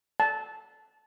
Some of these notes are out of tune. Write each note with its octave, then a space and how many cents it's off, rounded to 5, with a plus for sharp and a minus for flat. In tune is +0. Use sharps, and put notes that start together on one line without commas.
A5 -15